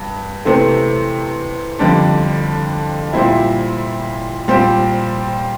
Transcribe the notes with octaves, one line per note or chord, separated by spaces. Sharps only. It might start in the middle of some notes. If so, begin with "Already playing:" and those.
Already playing: G2
C3 E3 A3 C4
F2 D3 G3 D4
A#2 G3 C4 E4
A#2 G3 C4 G4